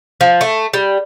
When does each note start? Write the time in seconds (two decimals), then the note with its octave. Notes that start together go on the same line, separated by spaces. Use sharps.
0.21 F3
0.41 A3
0.74 G3